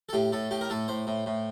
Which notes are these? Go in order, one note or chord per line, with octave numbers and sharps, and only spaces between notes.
A4
A2 G4
A2 A4
A2 G4
A#4
A2 A4
A2 C5
A2
A2